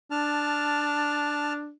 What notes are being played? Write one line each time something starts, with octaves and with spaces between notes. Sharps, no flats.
D4 A5 F6